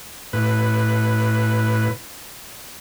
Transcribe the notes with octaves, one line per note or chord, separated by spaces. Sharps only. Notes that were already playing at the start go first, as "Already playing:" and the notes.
A2 B4